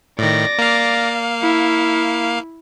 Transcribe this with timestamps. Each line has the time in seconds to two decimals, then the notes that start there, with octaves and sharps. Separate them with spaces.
0.19 A2 D#3 D5 A#6
0.58 A#3 F5
1.42 E4